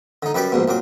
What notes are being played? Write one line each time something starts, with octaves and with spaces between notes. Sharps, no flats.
D3 D#4
F#2 G3 B4 D5 G5 D6
A#1 G#2 B2
C2 A#2 F#3 D6